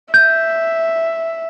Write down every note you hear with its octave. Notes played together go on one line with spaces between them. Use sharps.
E5 G6